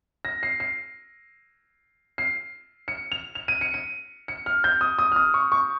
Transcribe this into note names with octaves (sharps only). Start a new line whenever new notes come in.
A#6
C7
C7
C7
C#7
F7
F7
D#7
C#7
D#7
C#7
F6
G6
D#6
D#6
F6
D#6
C#6
C#6